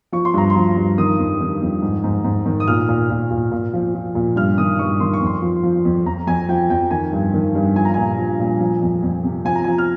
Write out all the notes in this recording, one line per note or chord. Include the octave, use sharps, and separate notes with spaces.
F3 C#6
C6
G2 A#5
C6
F3
G2
D#3 D#6
F2
D#3
F2
G#2
G#2
G#2
D#3
D#6
A#2 F6
A#2
A#2
A#2
A#2
F3
F3
A#2
G2 F6
D#3 D#6
G2 C#6
D#3 C6
C#6
F2 C6
F3
F3
F2
F2 A#5
F2 G#5
F3 G5
F2 G5
D#3 G#5
G2
D#3
G2
F3 G#5
A#5
A#2 G#5
F3
A#2
F3
F2
F2
C3
F3 G#5
A#5
F3 G#5
F6